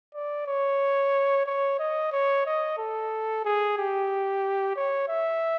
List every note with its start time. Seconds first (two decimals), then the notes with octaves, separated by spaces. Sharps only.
0.15 D5
0.47 C#5
1.46 C#5
1.79 D#5
2.12 C#5
2.46 D#5
2.78 A4
3.45 G#4
3.78 G4
4.76 C#5
5.09 E5